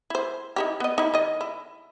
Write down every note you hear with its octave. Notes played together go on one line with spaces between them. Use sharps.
E4 C5
D#4 E4 G4
B3 D#5
D#4 E4
D#3 D#5
E4